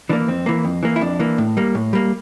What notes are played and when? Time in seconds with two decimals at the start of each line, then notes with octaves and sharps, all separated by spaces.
0.09 E3 D4
0.13 A#3
0.28 F2 C4
0.46 E3 A#3
0.65 F2
0.83 E3 A#3
0.96 E4
1.01 F2 D4
1.20 E3 A#3
1.38 A2
1.57 G3 A#3
1.75 A2
1.93 G3 A#3